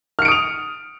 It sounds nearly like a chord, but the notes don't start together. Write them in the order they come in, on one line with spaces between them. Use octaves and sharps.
F6 C#7 D7 D#6 F7